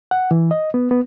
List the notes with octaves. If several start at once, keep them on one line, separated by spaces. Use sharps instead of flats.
F#5
E3
D#5
B3
B3